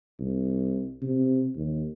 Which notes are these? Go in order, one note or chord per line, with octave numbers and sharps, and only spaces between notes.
C2
C3
D#2